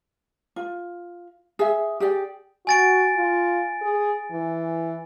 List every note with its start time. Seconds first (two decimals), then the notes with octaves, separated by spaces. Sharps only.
0.56 F4
1.59 G#4 E5
2.00 G4 G#4 D5 G5
2.67 F#4 G#5 A6 D7
3.16 F4
3.81 G#4
4.31 E3